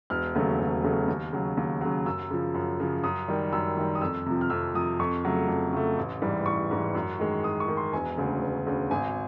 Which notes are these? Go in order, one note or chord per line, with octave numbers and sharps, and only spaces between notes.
E1 F6
D#2 C#3 F#3 A3
E1
D#2 C#3 F#3 A3
D#2
C#3 F#3
D#2
C#3 F#3
F#2 E6
C#3 F3
F#2
C#3 F3
F#2 D#6
D#3 G3
F#2 E6
D#3 G3
D#6
F2 E6
C3 F3
F6
F2 E6
C3 F3 D#6
F2 C#6
C#3 F#3 A3
F2
C#3 F#3 A3
A1
G#2 E3 G3
A1 C#6
G#2 E3 G3
F#2
D#3 G#3
F#2 D#6
C#6
D#3 G#3
C6
E1 G#5
D2 C#3
E1
D2 C#3
G#1 G#5